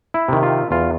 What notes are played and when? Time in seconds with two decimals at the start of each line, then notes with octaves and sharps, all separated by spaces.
0.14 E4
0.28 C3 D#3
0.43 F4
0.71 E2 F4